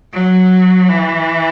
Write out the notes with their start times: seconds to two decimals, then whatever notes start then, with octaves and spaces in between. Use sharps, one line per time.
0.13 F#3
0.89 E3